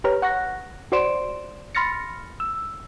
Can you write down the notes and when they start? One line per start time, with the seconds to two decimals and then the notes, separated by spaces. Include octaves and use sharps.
0.04 G4 B4 C#5 A#5 F6
0.22 F#5 C#6 F#6 A#6
0.92 F#4 C5 D5 C6 D7 E7
1.75 B5 C6 F6 A6 A#6 C#7
2.40 E6